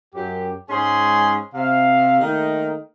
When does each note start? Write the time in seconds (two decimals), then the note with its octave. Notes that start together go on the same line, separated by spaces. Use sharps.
0.15 F#2 G4
0.70 G#2 G#3 C#4 G#4 G#5 C6
1.54 C3 F5
2.20 D#3 A3 A#3 D#4